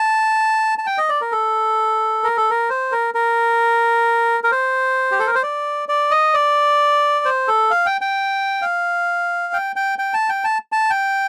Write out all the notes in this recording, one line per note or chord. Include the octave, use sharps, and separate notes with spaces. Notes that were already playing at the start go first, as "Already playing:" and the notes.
Already playing: A5
A5
G5
D#5
D5
A#4
A4
A#4
A4
A#4
C5
A#4
A#4
A#4
C5
G4
A4
A#4
C5
D5
D5
D#5
D5
C5
A4
F5
G5
G5
F5
G5
G5
G5
A5
G5
A5
A5
G5